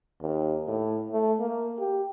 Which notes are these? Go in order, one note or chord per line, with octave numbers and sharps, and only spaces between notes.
D#2
A2
A3
A#3
G4